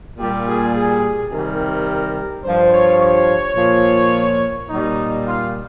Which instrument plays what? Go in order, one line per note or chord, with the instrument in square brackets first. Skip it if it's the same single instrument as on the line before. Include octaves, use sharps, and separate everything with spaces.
[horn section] A#2 G3 G4
G#4
G#4
C3 D#3 G3 A#4
G2 F3 C5
C#5
C#5
A#2 F3
A#2 G3 D#4
F4